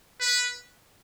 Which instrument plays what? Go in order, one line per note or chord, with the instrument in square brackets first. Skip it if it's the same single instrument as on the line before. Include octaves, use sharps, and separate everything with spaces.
[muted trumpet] B4